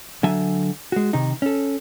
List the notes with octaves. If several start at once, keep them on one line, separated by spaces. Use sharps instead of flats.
D3 F#3 E5 G#5
G#3 F#4
C3 D#3 D#4
C#4 A4